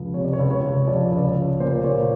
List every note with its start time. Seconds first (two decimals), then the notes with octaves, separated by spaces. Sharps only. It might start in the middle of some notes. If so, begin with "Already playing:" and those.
Already playing: C#2 F3
0.14 C3 C#5
0.24 D5
0.33 C#5
0.39 C#2
0.51 C#5
0.63 C#2
0.87 F3 D5
1.12 C#2
1.17 D5
1.23 C#5
1.36 C#2
1.60 A#2 C5
1.84 A#2 C#5